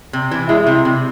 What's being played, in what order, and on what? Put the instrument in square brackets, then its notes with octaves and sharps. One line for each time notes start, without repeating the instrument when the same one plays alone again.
[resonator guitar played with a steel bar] C3
E3
[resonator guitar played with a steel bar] G#3 [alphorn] E4
[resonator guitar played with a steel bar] C3
C3